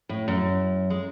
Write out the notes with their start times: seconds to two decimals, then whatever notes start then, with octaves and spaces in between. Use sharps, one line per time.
0.09 A2
0.28 F#2
0.90 G#3